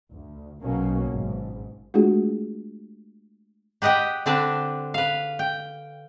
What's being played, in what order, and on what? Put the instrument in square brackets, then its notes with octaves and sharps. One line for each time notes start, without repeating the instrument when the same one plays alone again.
[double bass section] D2
B1 B2 F#3 A#3 C#4
G#1 G#2
[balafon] G#3 A3 D4 F4 F#4 G#4
[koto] G4 B4 D#5 F#5 G5
D3 C4 D4 B4 D5 A5
B4 F5
G5